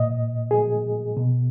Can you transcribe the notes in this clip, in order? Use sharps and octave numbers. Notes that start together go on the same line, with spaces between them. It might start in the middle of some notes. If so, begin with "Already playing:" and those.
Already playing: A#2 D#5
G#4
B2